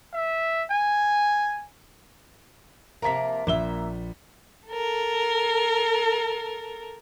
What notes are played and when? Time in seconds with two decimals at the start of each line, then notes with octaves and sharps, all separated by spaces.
0.13 E5
0.70 G#5
3.02 C3 F3 A#3 A#5 B6
3.47 A#1 A#3 E5 G7
4.69 A4 A#4